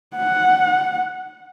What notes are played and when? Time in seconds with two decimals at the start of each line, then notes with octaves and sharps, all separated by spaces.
0.17 F#5